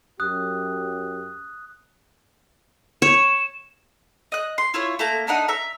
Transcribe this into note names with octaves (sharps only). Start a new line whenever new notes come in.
F#2 F#3 G4 D#6 F#6
C#5 E7
D#5 F#6
C6
E4 F4 C#5
A3 A#3 A#5
A3 D4 D#4 F#5
E5 A#5